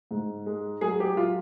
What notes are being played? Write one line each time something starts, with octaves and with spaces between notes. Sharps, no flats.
G#2
G#3
F#3 G#4
G4
F#3 F4